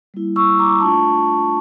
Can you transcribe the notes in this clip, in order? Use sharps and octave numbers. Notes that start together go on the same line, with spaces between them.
G3 A#3 E4
C#6 E6
A#5 D6
A3 D4 F4 A5 C#6